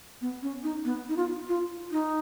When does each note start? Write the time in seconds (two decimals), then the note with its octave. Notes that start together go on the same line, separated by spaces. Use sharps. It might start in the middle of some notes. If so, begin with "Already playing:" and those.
0.21 B3
0.42 C#4
0.63 D#4
0.85 B3
1.09 D#4
1.16 F4
1.48 F4
1.91 D#4